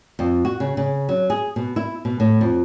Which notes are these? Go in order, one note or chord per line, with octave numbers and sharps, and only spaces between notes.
F2
F#4
C#3
C#3
F#3
G#4
B2
E4
B2
A2
F2